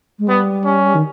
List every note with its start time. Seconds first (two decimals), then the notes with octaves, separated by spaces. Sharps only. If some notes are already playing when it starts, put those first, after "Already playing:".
0.19 G#3
0.28 G3 B3
0.65 C#4
0.95 D#3